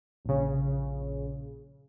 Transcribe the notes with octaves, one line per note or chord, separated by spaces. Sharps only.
A#1 C#3